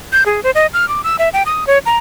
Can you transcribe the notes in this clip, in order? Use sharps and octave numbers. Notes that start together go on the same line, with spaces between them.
G6
G#4
C5
D#5
F6
D6
E6
E5
G5
D#6
C#5
A#5